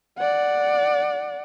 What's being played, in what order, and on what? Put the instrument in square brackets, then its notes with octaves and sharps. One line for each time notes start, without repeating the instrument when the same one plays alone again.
[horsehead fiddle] D5 F#5